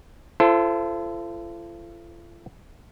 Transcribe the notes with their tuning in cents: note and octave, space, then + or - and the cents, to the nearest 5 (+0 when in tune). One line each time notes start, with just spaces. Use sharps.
F4 -45 A4 +0 C5 -10